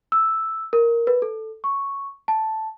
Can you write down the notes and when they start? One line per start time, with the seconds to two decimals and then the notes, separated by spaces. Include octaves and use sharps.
0.12 E6
0.73 A#4
1.07 B4
1.22 A4
1.64 C#6
2.28 A5